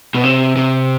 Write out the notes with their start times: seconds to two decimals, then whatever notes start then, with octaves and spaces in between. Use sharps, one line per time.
0.15 B2
0.24 C3
0.56 C3